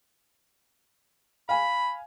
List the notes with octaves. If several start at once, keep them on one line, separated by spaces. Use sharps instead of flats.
F5 G#5 B5